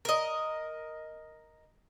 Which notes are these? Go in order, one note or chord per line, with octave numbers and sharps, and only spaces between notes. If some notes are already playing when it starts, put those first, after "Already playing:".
A#4 D#5